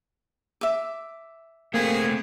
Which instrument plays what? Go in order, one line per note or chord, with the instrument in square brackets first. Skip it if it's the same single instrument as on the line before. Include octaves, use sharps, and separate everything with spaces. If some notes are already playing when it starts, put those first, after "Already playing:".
[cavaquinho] E5 D6
[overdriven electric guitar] A3 C4 [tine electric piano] A#3 [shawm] G#4